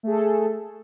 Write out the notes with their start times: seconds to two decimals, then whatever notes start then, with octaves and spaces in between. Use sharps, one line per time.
0.03 A3
0.07 G#4
0.11 A4